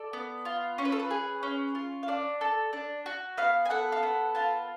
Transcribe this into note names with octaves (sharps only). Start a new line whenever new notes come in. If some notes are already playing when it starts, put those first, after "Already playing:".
Already playing: A4 D5
B3
F4
C#4 C#5
B4
A4
B4
G#4
C#4
F4
F5
D4 D5
A4
D4
F#4
B3 F5
G#5
A4 F#5
F5
B3 F#5
F4 A5